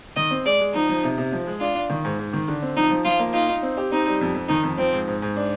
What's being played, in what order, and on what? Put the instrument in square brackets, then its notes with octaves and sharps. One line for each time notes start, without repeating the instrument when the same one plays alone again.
[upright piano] D#3 [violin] D#5
[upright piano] C4
[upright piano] G#3 [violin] D5
[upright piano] G#3
[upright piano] F3 [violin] D#4
[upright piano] F3
C3
C3
F3
G#3
[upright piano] D4 [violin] F4
[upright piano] D4
D#3
G#2
G#2
D#3
D3
C4
[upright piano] F3 [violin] D#4
[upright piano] F3
[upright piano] F3 [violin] F4
[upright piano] A#3
[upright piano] D#4 [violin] F4
[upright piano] D#4
C4
G4
[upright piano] C4 [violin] D#4
[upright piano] G3
F2
F2
[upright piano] D#3 [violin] D#4
[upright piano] F2
[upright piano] F3 [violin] C4
[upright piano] G#2
G#2
G#2
D4